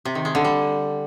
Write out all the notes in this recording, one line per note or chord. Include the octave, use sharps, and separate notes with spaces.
C3
D#3
G#3
D3
G3